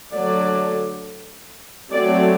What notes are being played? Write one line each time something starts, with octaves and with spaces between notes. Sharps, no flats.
D3 F#3 A3 D5
F#3 A3 C4 D5